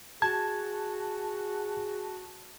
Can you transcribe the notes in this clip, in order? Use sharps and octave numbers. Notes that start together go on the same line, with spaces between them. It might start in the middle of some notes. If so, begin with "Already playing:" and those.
F#4 G#4 A5 G#6